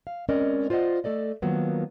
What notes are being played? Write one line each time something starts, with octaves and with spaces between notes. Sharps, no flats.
F5
G#3 C4 C#4 A#4 D5 D#5
F4 C5 D5 D#5 F#5
A3 A4 D5 D#5
D#3 F3 F#3 A#3 B3